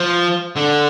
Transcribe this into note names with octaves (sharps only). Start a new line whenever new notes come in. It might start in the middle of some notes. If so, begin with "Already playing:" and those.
Already playing: F3
D3